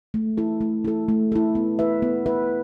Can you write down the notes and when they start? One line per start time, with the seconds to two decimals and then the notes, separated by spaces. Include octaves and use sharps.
0.14 A3
0.37 E4 A4
0.61 A3
0.85 E4 A4
1.09 A3
1.32 E4 A4
1.55 B3
1.79 E4 B4 E5
2.02 B3
2.26 E4 B4 E5